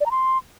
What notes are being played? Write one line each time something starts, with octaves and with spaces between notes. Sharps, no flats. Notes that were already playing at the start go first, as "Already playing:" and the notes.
D5
A#5
C6